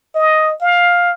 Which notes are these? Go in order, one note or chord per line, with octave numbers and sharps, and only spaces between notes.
D#5
F5